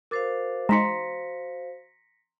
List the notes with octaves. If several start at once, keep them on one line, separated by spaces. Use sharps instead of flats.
F#4 A#4 C5 F5 D6 A6
G#3 D#4 A#5 C6 A#6 B6 C#7